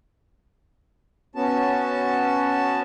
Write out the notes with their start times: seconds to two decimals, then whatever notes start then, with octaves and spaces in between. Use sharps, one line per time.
1.36 B3 C#4 F#4 A5